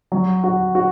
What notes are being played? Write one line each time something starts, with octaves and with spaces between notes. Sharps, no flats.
F#3
F#4
F#4